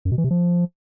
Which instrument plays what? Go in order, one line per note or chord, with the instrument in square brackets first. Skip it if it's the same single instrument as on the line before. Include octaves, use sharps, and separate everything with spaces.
[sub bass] F#2
B2
E3
C3
F3